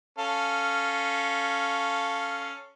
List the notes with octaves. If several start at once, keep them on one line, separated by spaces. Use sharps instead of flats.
C#4 A4 F5